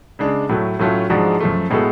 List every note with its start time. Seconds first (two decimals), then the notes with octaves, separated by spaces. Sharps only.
0.19 C#3 G#3 D4
0.49 A2 F#3 A3
0.79 A2 F#3 A3 C#4 F4
1.10 G#2 F3 G#3 D4 F#4
1.40 F#2 F3 A3
1.70 A2 G#3 B3 F#4 A4